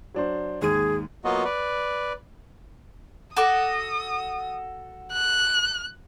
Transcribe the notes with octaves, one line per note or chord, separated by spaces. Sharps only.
F#3 D4 C5
D#2 G#2 G#4 D#7
F#3 A#3 B3 F4 F#4 D#5
B4 D5
F#4 A4 D6 D#6
F#6